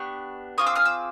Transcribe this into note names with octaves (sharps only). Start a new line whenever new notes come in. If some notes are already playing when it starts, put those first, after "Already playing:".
Already playing: B3 D4 G4 C#6
C4 F4 G#4 C#6 D#6
D6 E6
D#6 F6
D6 E6